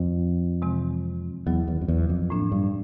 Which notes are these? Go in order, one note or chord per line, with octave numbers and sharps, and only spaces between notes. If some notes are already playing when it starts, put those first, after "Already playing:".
Already playing: F2
C3 E3 G#3 C4
E2 D#3 F#3 B3
E2
F2
E2
F2
A2 F3 A#3 D4
G2